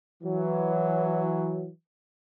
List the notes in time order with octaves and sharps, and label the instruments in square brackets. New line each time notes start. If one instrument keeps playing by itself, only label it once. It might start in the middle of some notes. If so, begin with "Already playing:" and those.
[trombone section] E3 F#3